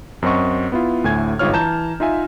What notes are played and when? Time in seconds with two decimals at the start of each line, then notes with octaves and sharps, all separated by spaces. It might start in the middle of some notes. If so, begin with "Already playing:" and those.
0.22 F#2 C4 F#4 D#5 C#6
0.72 B3 E4 F4
1.04 D2 A2 G#5 G#6
1.39 G1 G#2 F4 C#5 F6
1.53 E3 A5 A#5 G6 E7
2.00 D#4 F4 E5 G#5